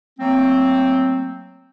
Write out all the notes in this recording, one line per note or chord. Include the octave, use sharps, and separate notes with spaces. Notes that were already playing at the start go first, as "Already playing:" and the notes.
F#3 A3 A#3 C4